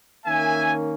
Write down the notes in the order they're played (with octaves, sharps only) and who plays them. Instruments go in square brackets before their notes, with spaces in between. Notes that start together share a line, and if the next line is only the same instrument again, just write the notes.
[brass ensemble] D#3 A#3 C#4 E5 G#5